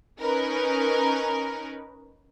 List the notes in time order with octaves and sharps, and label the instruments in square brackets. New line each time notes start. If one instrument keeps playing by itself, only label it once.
[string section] C#4 D#4 A#4 B4